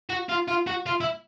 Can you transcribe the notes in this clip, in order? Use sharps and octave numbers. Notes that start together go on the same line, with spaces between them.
F#4
F4
F4
F#4
F4
E4